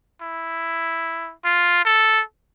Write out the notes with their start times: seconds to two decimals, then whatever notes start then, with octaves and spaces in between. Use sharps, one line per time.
0.22 E4
1.44 F4
1.85 A4